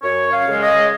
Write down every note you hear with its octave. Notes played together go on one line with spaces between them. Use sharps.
F#2 C#5
F5
C#3 G#3
D#5